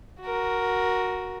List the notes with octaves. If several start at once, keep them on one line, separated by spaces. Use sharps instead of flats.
F#4 A#4